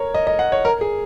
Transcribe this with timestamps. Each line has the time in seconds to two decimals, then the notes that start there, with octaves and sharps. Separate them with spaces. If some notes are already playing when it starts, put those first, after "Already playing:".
Already playing: A#4 C#5
0.14 D#5
0.27 D#5
0.39 F#5
0.52 C#5
0.65 A#4
0.81 G#4